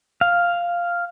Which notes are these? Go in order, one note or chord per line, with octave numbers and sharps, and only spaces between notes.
F5